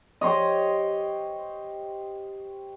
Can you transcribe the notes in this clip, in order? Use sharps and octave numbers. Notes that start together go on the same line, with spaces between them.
G4 C5 C#5 D#5